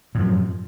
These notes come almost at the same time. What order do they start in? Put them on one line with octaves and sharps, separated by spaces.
A2 F#2 F3